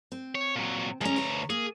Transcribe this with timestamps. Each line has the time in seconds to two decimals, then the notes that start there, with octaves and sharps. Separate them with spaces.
0.12 C4
0.35 C#5
0.56 A#2 F#3
1.01 D2 G#3 C#4 A#5
1.16 B4 C#5
1.50 A#3 G#4